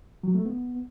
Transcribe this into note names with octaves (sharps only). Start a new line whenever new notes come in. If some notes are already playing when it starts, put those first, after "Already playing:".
F#3
A3
B3